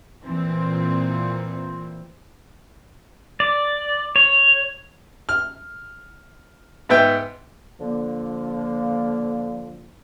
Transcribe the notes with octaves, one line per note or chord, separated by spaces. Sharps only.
A#2 E3 C4
D5
C#5
F6
G#2 B3 E5 G5
D3 F3 A#3